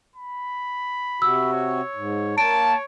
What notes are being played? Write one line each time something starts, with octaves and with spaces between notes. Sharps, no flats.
B5
C3 F#4 E6
C#5
G#2
A#3 C#5 A5 D7